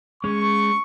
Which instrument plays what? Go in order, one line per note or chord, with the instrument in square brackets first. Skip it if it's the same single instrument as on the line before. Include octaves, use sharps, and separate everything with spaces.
[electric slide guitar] G#3 C#4 [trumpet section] C#6